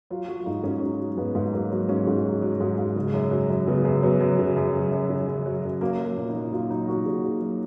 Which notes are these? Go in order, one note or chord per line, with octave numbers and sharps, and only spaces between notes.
F#3 F4
F#3 F#4
F4
G#2 D#4
G#2 C#4
F#3
F#3
G#2 B3
G#2
F#3 A#3
F#3
G#2 C#4
G#2
F#3
F#3
G#2
G#2
C#3
F#2
F#3
F#2
C#3 B3
F#2
F#3 B3
F#2
C#3
F#2
F#3
F#2
C#3
F#2
F#3
F#2
F#3 A#3
F#3
A#3
A#2
D#4
A#2
F#3 F4
F#3 D#4
A#2 F#4
A#2 G#4
F#3
F#3